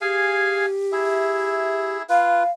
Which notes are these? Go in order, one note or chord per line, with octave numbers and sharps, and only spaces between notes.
G4 G#4 F5 G#5
E4 G#4 E5
F4 B4 F5